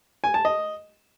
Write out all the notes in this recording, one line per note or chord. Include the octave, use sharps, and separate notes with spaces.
G#5
A5
D#5